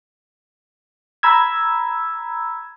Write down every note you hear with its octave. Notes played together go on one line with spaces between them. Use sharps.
A#5 B5 E6 G#6